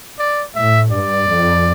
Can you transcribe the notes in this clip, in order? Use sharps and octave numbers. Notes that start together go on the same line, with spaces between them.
D5
A2 E5
G2 D5
F2